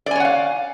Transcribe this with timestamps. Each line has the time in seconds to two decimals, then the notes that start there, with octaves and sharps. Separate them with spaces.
0.06 D5
0.11 G#5
0.16 C#5
0.20 F#5
0.25 F5